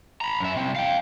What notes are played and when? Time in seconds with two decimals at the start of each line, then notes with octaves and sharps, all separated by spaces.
0.21 A#5 B5
0.40 F#2 E5
0.56 C2 C4
0.75 F5 G5